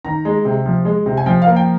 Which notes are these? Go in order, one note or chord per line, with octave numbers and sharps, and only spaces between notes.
D#3 A#5
G#3
C3
F3
G#3
C3
G#5
F3 G5
F5
A#3
G5